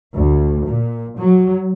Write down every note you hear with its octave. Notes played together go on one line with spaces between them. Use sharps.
D2
A#2
F#3